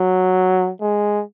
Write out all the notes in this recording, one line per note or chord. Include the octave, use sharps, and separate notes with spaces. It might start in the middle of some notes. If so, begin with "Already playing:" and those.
Already playing: F#3
G#3